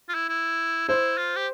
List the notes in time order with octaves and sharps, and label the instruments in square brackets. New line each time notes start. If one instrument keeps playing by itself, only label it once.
[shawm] F4
E4
E4
[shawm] E4 [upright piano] C5
[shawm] F4
G4